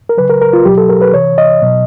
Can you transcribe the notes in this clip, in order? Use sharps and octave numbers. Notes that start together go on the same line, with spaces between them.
A#4
C#3 F#3 B4
A#4
A#4
F4
B2 F#3 G4
A4
A#4
B4
C3 E3 C#5
D#5
B2 F#3